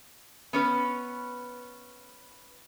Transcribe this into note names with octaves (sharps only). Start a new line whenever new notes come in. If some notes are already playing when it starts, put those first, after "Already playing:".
B3 C#4 B4